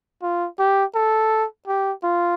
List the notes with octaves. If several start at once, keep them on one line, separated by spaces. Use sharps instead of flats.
F4
G4
A4
G4
F4